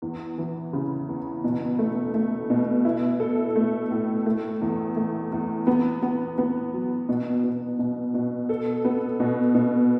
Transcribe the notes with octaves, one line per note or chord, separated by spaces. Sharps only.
E2
E3
C#3
E2
B2
A3
A3
B2
E4
A4
A3
A2
A3
E2
A3
E2
B3
B3
B3
F#3
B2
B2
B2
B2
A4
B3
B2
B2